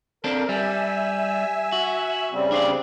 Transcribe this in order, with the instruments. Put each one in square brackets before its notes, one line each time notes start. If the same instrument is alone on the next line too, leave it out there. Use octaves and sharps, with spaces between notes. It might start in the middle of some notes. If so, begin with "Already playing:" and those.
[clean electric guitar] C4 D4 A4 [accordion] A#4
[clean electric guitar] G3 [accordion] E5 G#5 E6
[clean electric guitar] F#4
[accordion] C#3 G3 C4
[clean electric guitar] D4 C5 D5